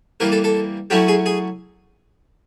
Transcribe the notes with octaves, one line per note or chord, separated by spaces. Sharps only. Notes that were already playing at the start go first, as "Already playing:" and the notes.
E3 G3 A#3 A#4
A4
A4
F#3 A3 C#4 E4 G4
G#4
G#4